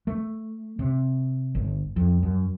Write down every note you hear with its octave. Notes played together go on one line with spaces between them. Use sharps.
A3
C3
G1
F2
F#2